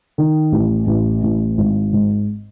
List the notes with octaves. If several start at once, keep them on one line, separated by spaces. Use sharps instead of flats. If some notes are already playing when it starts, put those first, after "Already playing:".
D#3
A1
A1
A1
G#1
G#2